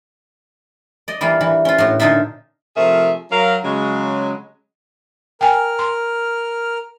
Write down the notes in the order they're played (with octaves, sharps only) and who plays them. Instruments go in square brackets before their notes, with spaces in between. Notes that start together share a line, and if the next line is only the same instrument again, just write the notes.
[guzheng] D5 D#5
E3 G3 A#3 F4
E3
C#4 F4
A2 F#4
A#2 D3 D#4 F4 E5
[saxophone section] C3 F3 A3 G#4 A#4 E5
F#3 A#4 F5
C#3 F#3 G#3
[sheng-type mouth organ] A#4 F6 [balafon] G5 G#5
[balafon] C6